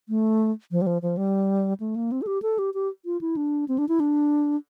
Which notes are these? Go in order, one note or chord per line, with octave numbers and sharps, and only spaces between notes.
A3
F3
G3
F3
F3
G3
A3
A#3
C4
A4
G4
A4
G4
G4
F4
E4
D4
C4
D4
E4
D4